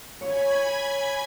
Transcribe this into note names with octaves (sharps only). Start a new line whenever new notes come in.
C#5 G#5 B5 G#6